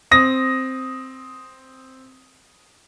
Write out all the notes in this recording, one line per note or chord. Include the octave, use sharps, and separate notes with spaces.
C4 D#6 A#6